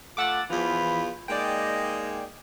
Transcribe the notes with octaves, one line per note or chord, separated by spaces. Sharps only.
A3 F4 F#5 D6 E6 A6
E2 E3 F3 F4 B5
G#3 A#3 D#4 D5 D#5 G5